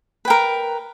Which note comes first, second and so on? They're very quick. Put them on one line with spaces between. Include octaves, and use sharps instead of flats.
B4 G5 A#4